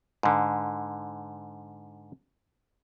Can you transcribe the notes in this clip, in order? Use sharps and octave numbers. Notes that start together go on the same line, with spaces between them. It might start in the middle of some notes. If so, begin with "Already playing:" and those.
G#2 D3